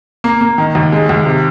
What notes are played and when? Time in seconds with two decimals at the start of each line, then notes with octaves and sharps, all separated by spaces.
0.24 A#3
0.41 A#3
0.58 D#3
0.75 D#2
0.92 G#3
1.09 D#2
1.26 C3